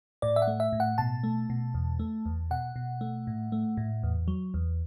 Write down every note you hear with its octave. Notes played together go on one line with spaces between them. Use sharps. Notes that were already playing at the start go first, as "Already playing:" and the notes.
A2 D5
E5
F#5
A3
E5
A2
F#5
B2 A5
A3
B2
E2
A3
E2
B2 F#5
B2
A3
A2
A3
A2
E2
F#3
E2